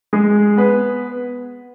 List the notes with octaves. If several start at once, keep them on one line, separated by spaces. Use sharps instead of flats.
G#3 G#4
B3 B4